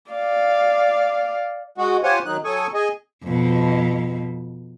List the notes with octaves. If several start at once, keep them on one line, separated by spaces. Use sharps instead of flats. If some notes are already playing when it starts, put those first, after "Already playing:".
D5 F5
G#3 F#4
F4 G4 C5 C#5 F#5 G#5
D#3 F#3 D#4 F#6
F#3 A4 G#5 C#6 D#6
G#4 D#5 G#5
F2 B2